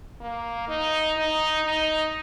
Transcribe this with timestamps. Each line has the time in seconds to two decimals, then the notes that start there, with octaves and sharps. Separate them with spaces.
0.21 A#3
0.68 D#4
1.17 D#4
1.65 D#4